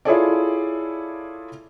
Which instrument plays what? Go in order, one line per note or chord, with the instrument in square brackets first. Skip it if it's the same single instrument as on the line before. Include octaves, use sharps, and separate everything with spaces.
[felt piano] E4 F4 G#4 A4 C#5 D5